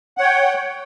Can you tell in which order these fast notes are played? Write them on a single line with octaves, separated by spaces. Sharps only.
F#5 C#5 G5